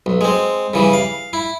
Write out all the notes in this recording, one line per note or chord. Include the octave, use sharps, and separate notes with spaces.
B1
G#3 C4
C#3 E3 G3
F5
E4